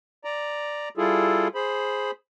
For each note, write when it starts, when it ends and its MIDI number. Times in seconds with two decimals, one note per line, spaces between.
0.24 0.89 74
0.24 0.89 82
0.97 1.48 55
0.97 1.48 64
0.97 1.48 65
0.97 1.48 68
0.97 1.48 69
1.55 2.11 68
1.55 2.11 72
1.55 2.11 83